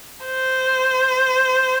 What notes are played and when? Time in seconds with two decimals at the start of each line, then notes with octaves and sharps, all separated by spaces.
0.26 C5